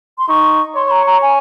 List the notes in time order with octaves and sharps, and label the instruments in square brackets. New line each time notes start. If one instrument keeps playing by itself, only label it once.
[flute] C6
[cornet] D#4 [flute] C#6
[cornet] C#5 [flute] C6
[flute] C6
A#5
A#5
G#5